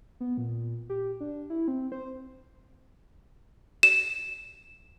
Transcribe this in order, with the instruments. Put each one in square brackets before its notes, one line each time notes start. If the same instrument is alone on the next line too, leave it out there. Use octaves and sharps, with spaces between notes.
[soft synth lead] B3
A#2
G4
D4
E4
C4
C5
[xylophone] E7